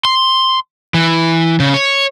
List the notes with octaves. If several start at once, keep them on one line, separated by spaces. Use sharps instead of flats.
C6
E3
C#3
C#5